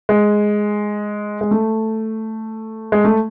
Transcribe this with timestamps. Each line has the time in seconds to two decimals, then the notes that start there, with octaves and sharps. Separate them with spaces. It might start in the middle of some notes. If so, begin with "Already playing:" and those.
0.09 G#3
1.41 G#3
1.51 A3
2.92 G#3
3.04 A3